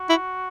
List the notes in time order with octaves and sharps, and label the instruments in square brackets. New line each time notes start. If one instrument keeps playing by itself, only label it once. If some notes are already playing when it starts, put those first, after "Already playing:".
Already playing: [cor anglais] F#4
[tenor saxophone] E4